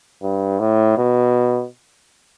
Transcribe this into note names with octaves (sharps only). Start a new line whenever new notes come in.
G2
A2
B2